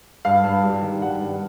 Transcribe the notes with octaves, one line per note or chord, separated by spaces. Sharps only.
G2 F5
G2
G3
D#3
G3 F#5
G2